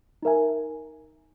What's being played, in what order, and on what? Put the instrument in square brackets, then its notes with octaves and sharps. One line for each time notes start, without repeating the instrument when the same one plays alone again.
[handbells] D#4 A#4 E5 G#5